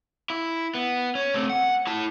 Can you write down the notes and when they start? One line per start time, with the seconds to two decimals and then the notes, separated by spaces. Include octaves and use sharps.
0.30 E4
0.75 B3
1.15 C#4
1.34 A3 C4
1.49 F#5
1.87 E4 A5